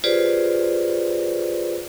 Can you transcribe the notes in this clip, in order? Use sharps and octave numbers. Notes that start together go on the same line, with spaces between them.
F4 G4 G#4 B4 C5 D5